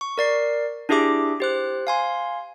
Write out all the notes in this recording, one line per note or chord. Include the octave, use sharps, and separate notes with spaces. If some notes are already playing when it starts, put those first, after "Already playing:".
C#6
A#4 D5 C7
D4 E4 G4 G#4 E5 D6
G4 C5 F#6
F5 G#5 C6